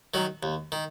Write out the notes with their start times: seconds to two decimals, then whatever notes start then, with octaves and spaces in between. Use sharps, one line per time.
0.14 D#3 F#3
0.43 D#2
0.72 D#3